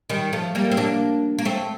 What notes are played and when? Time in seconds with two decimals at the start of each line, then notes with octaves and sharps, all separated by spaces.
0.10 D#3 G3
0.33 F3 A3
0.55 G3 A#3
0.71 C4
0.77 A#3 D4
1.38 A#3
1.45 A3 C4